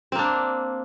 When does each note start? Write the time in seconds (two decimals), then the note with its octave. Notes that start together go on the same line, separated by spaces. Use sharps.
0.12 C4
0.15 A#3
0.19 D4